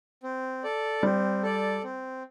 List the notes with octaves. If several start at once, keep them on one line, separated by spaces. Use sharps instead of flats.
C4
A4 D5
G3 C4
A4 D5
C4